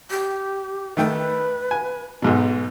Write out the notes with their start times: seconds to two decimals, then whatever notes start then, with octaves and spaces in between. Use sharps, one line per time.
0.11 G4
0.97 D#3 A3 B4 G5
1.71 G#5
2.22 B1 G#2 B2